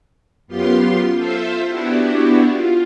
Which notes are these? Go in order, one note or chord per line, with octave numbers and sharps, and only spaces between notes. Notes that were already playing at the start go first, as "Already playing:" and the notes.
F#2 B3 F4 G4 C6
F4 A4 C5 E5
B3 D4 E4 F#4 G4
F4